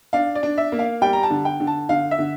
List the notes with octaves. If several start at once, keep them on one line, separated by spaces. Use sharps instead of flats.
D4 F5
D5
D4
E5
A#3
F5
G3 G5
A#5
A5
D3
G5
D3
A5
D3 F5
E5
D3